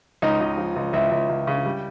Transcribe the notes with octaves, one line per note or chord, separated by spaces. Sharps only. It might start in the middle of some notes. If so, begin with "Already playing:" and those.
C#2 D#4 D#5
C#2
F3
C#2
C#2 E4 E5
C#2
C#2
C#3
G3